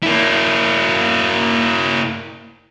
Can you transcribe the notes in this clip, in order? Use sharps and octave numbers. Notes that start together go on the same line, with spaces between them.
A#3 E4